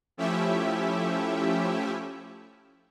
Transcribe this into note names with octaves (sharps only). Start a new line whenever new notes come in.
F3 A3 C#4 E4 G4 E5